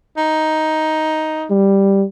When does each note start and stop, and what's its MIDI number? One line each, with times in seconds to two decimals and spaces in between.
0.17 1.48 63
1.50 2.05 55